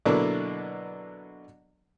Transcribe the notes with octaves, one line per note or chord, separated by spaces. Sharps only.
B2 D3 F#3 A#3 D4 E4